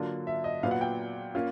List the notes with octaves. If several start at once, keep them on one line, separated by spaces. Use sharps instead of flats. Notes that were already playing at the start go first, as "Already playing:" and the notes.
Already playing: D3 F#3 A#3 D4 F4
E5
D#5
A#2 F#3 B3 F5
F#5
G5
A#3 C#4 F4